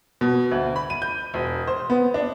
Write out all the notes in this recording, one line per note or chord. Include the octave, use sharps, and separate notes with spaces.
B2
D2
B5
D#7
G6
E1
C5
B3
D4